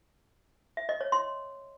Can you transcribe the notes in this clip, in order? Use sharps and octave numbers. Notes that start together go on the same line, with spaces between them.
E5
D#5
C#5
C6